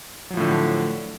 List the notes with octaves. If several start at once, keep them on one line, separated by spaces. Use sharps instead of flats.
A2 D3 F3 F#3